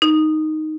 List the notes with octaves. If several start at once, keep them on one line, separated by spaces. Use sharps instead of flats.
D#4